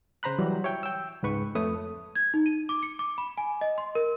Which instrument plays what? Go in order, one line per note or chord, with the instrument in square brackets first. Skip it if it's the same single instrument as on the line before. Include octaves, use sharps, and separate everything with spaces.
[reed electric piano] C#3 C5 A#5 B5 F#6
E3 F#3 G3
C#5 E5 G5
G5 E6
C#2 G#2 B4 C#6
F2 A3 B4 C#5 D#6
[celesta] G#6
D#4
D#7
D6
C#7
D6
B5
G#5
D#5
C6
A#4